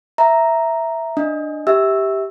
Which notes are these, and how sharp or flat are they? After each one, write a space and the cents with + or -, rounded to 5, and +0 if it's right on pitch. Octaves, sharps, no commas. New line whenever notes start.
E5 +0 A#5 +0
D4 +15 D#5 +0
G4 +0 E5 -20 E6 +0